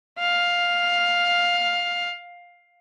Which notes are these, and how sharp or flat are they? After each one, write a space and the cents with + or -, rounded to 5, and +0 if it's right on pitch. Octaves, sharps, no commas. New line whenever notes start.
F5 +10